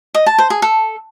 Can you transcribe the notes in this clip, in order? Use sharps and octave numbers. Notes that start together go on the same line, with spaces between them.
D#5
A5
C5
G#4
A4